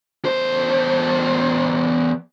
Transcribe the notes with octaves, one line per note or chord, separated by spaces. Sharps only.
E2 C5